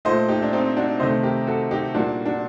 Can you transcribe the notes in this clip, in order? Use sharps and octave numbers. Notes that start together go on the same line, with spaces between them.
A#2 A3 C5 D#5
D#4 G4
D4
C4 D#4
D4 F#4
C3 D#3 A3 C5 D#5
G4 A#4
F#4 A4
D#4 G4
A#2 G3 A#3 D4 F#4
D4 F#4